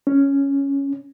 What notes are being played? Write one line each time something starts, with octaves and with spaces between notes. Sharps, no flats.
C#4